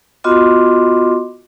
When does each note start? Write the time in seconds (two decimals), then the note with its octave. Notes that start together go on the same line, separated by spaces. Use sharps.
0.24 B3 F4 F#4 D#5 C6 D6